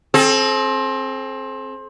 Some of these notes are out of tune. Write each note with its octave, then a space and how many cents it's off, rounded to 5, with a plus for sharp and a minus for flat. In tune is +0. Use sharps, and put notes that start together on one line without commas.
C4 +20 A4 -40